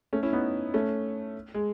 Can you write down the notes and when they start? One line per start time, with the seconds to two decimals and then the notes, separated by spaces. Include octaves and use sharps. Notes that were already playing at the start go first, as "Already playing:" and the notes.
0.13 A3 C#4
0.23 C#4 E4
0.33 B3 D#4
0.74 A3 C#4
1.54 G#3